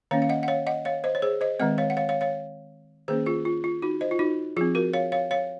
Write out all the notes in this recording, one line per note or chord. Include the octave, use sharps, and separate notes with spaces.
D#3 A#3 C#4 C#5 F5
F5
D#5 F#5
F#5
C#5 F5
D#5 F#5
C#5 F5
C5 D#5
C#5
G#4 C5
C5 D#5
D#3 G#3 C4 D#5 F#5
C#5 F5
F#5
C#5 F5
C#5 F5
C#5 F5
D#3 A#3 C#4 G#4 C5
F4 G#4
F4
F4
D#4 F#4
C5 D#5
F4
D#4 F#4
F3 C4 F4 G#4
F#4 A#4
C#5 F5
C#5 F5
C#5 F5